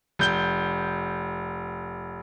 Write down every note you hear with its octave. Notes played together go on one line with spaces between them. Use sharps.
F1 G6 G7